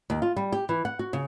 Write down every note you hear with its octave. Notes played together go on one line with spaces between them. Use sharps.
D#2
F4
G3
G4
E3
F#5
F#4
C#3